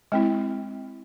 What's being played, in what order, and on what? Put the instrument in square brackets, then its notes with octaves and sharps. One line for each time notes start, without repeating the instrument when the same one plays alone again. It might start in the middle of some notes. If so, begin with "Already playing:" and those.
[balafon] G#3 C4 E4